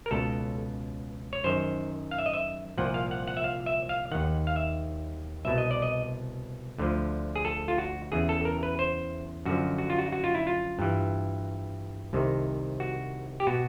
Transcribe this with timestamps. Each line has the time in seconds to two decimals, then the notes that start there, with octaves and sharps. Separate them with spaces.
0.06 A#4
0.11 C#2 B2 A4
1.33 C#5
1.44 F#2 D#3 C5
2.11 F5
2.18 E5
2.26 D#5
2.34 E5
2.78 C2 A#2 F3 F#5
2.94 F5
3.11 F#5
3.27 F#5
3.37 E5
3.44 F5
3.66 E5
3.89 F5
4.11 D#2 D#3 F#5
4.47 F5
4.56 E5
5.45 C2 B2 E5
5.58 D#5
5.71 D5
5.82 D#5
6.78 D2 D3 F3
7.36 G#4
7.45 A4
7.68 F4
7.78 F#4
8.12 E2 C#3 E3 G#4
8.29 A4
8.45 A#4
8.63 B4
8.79 C5
9.45 F#2 D3 F3 F#4
9.78 F#4
9.90 F4
9.99 F#4
10.12 F#4
10.24 F4
10.35 E4
10.47 F4
10.79 G2 E3
12.13 C2 C3 D#3
12.80 F#4
13.40 G4
13.47 B2 F#4